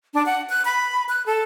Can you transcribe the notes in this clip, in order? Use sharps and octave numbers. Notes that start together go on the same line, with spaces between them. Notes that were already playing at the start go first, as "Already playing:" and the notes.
D4
F#5
F#6
B5
F#6
A4